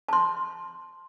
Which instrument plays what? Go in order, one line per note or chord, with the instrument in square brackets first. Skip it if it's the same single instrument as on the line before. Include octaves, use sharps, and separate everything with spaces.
[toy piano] A5 C6